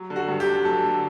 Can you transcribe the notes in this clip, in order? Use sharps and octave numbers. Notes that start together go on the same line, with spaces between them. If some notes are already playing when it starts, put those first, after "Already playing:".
Already playing: F#3
D3
F#4
G2
G4
G2
F#3 A4
D3